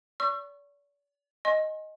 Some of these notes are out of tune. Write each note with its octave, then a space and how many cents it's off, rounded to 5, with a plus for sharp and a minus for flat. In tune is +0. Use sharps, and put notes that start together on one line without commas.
D5 -40 C#6 -10 E6 +45
D#5 +0 G#5 +5 C6 +35